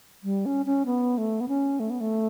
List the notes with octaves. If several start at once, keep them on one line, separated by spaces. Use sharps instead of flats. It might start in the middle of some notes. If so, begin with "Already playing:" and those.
G3
C#4
C#4
B3
A3
B3
C#4
A3
B3
A3